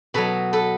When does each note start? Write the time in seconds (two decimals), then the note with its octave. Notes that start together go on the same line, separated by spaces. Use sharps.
0.14 B2 F#3 A4 B4
0.53 A4 B4